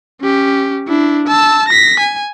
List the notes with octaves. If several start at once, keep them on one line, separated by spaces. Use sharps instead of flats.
C#4 G4
D4 E4
A5 E6
A#6 B6
G#5